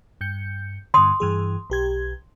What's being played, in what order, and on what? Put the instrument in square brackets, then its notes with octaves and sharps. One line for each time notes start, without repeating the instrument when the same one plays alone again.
[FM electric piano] G2 G6 C#7
[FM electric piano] G2 D3 [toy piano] C6 D#6
[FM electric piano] G2 E3 G#4
B1 G4 G#6